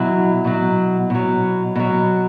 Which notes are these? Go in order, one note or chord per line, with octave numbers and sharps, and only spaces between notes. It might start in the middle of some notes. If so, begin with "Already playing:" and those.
Already playing: B2 F#3 E4
B2 F#3
B2 F#3
B2 F#3